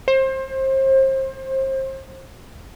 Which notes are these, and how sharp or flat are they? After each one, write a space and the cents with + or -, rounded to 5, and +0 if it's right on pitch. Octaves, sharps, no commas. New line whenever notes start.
C5 +30